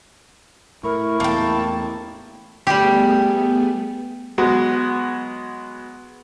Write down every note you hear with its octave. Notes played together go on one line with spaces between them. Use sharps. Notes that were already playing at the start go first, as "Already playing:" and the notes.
A2 E4 A#4 C#6
E2 A2 A#3 G5 A5
G3 A3 B3 G4 G#4
F#3 G#3 B3 F#4